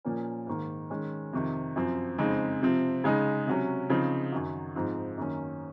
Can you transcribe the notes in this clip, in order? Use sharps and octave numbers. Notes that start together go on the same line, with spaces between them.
A#2 F3 A#3 C#4
G#2 D#3 A#3
D#3 G#3 C#4
F2 C3 D#3
F#2 F3 C4
F2 C#3 G#3 C4 D#4
C3 F3 C4
C#3 G#3 D#4
C3 F#3 C#4
C#3 F3 C4 D#4
F#2 D#3 F#3
G#2 F3 C4 D#4
F#2 D#3 A#3 C#4